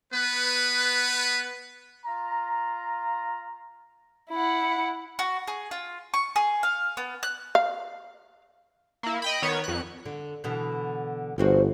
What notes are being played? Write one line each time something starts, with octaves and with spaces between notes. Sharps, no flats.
B3 B4
F4 A#5
E4 F#5
F#4
G#4
F4
C#6
G#4
F5
B3
F#6
F5
A#3 E4
D#5 G5 B5
D#3 B3 C#5
F2 F#6
D3
B2 D3 E3
G1 F3 C4 F#4